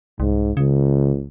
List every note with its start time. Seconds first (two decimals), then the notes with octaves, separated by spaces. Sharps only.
0.20 C2 G#2
0.57 C#2 C#3